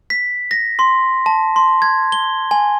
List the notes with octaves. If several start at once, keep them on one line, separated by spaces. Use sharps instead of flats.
B6
A#6
C6
A5
C6
G#6
G7
G#5